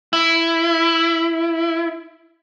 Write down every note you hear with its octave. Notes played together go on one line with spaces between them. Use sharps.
E4